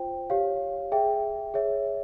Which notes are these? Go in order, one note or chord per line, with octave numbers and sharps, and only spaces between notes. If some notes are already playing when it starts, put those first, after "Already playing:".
Already playing: F4 C5 G5
G4 C#5 F5
G#4 E5 G5
G#4 C#5 E5